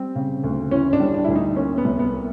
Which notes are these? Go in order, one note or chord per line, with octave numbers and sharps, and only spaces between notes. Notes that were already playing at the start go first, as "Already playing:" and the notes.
Already playing: G3 C4
C#3
D2
E3 C#4
D4
G3
D4
D2 E4
D#4
A#3 C#4
B3
C2
B3
A#3